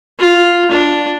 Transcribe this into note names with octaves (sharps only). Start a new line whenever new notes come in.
F4
D4